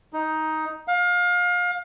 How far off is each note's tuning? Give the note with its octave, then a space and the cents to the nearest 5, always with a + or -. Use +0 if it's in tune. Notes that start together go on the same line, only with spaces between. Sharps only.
D#4 +10
F5 +30